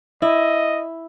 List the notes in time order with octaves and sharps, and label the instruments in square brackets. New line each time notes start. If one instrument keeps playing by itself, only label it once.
[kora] E4 [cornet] D#5